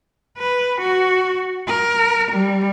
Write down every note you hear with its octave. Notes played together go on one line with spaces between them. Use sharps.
B4
F#4
A#4
G3